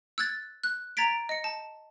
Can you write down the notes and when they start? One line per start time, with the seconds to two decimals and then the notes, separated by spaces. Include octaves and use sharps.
0.18 E6 F#6 G#6 A6
0.64 F#6
0.97 A#5 G#6 A6 B6 D7
1.29 D#5 C#7
1.44 A5